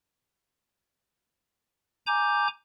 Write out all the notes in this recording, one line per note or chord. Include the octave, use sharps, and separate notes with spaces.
G#5 A#5 D6 G6